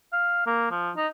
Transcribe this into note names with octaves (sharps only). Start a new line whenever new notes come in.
F5
A#3
F3
D#4